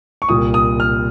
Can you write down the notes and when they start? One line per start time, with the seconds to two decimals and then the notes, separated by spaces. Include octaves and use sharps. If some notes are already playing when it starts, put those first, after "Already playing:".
0.22 C#6
0.29 C2 A#2 D#6
0.54 D#6
0.80 F6